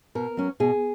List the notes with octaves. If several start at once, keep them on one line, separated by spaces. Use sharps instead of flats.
B2 A#4
F#3 C#4
B2 G#4